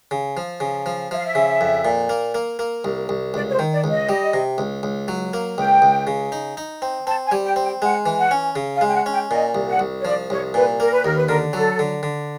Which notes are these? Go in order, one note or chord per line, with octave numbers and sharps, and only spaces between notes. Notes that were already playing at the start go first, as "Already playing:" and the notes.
C#3
F3
C#3
F3
F3 E5
F5
E5
C#3
F2
A#2
A#3
A#3
A#3
C2
C2
C#2 D5
C#5
C5
D#3
D5
C#2
D#5
G3
C3
C#2
C#2
F#3
A#3
C#2 G5
C#2
C#3
D#4
D#4
C4
C4 A5
G#5
G3
G5
C4
G5
G#3 F#5
E3
F#5
C#4
C#3
F5
G#3
G5
F#5
C#4
G5
A#2 D#5
C2
F#5
C2
C#5
F3 D5
C2 C#5
A#2 B4
A#3 A#4
B4
D#2 A#4
B4
D3 A#4
G#4
F#3 A4
D3
D3